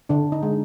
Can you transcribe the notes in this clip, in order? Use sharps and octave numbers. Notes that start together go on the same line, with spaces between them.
D3 D4
D#4
G#3